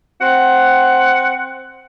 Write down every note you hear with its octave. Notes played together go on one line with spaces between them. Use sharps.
C4 F#5